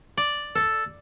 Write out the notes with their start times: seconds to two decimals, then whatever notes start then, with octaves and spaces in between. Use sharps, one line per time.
0.17 D5
0.56 A4